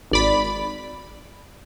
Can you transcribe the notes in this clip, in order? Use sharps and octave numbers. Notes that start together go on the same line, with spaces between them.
G#1 D5 B5